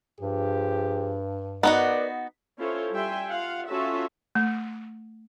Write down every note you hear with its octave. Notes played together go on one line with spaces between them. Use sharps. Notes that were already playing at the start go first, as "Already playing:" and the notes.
G2 F3 G4 G#4
B3 D#4 F#4 A#4 B4 D5
C#4 E4 F4 A4 C5 C#5
G3 E5 G5 G#5 C6
F4 F5 F#5
C#4 F4 F#4 A4 E5 A5
A3